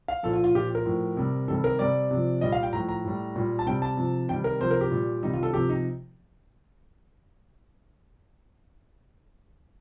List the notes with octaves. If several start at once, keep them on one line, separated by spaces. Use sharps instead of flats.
F5
A#2 F3 A4
F4
F4
A#2 F3 G4
A#4
A2 F3
C3 G3
C3 D#3 G3 A4
A#4
C3 G3 D5
C3 F3
A#2 G3 D#5
F5
G5
A2 F3 A#5
A#5
A2 G3
A#2 G3
A5
C3 G3 G5
A5
C3 F3
C3 D#3 G3 G5
A#4
C3 F3 C5
A#4
G4
A#2 G3
C3 D#3 G3 D#4
F4
A4
C3 F3 G4
D#4